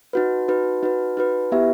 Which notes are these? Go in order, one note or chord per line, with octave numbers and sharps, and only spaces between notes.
D#4 F#4 B4
D#4 F#4 B4
D#4 F#4 B4
D#4 F#4 B4
B3 E4 G4 B4 E5